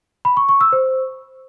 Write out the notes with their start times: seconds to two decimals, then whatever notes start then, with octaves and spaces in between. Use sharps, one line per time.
0.25 B5
0.37 C#6
0.49 C#6
0.61 E6
0.73 C5